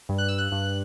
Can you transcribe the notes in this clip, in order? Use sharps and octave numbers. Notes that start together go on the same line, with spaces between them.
G2
F#6
E6
F#6
G2